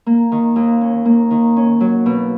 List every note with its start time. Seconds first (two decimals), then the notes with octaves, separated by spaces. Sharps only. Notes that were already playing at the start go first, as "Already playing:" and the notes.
0.06 A#3
0.32 D#3
0.56 D#2
0.81 C#4
1.05 A#3
1.31 D#3
1.56 C#4
1.81 F#3
2.06 B2